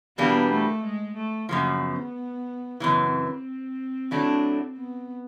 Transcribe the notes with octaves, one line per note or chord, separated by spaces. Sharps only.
E2 B2 G3 A#3 B3 D4
A3
G#3
A3
F#2 C#3 F3 A#3
B3
F#2 C#3 E3 B3
C4
A2 F#3 A3 D4
B3